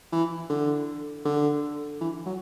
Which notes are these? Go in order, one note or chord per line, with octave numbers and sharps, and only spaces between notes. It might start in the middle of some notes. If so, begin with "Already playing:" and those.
E3
D3
D3
E3
F#3